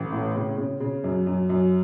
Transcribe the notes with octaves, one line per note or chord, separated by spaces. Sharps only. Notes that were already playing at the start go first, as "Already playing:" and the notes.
Already playing: A1
A2
C#3
C#3
C#3
F#2
F#2
F#2